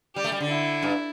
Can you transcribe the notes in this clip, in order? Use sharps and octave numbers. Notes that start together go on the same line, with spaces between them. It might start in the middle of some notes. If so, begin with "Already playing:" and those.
G3 G4
A3
G3
D3
E4
G2